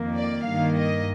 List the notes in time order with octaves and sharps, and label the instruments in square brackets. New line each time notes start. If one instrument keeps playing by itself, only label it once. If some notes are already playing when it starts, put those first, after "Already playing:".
Already playing: [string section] F2 D#3 A#3
D5
G2 D#3 A#3 F5
D#5